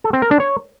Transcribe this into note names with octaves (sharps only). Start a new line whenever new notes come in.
A4
C4
A#4
D4
C#5